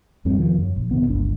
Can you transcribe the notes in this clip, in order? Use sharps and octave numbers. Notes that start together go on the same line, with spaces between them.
E2 G2 G3 C4
E2 C3 D#3 F3
F#2 F#3
A#1
A2 C3 D#3 B3
G1 C#2 D4